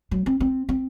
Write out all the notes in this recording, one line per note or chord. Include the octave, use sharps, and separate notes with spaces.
F#3
C4
C4
C4